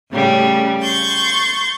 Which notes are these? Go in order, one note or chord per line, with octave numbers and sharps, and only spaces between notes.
A2 C#3 G3
C6 C#6 G6 A6